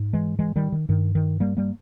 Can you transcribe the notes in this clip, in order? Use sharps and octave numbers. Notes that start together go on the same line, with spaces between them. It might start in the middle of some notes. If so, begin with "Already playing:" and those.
Already playing: G#2
E3 G#3
E3 G#3
D#3 G3
D#3
G2 D#3
D#3
G3 A#3
G3 A#3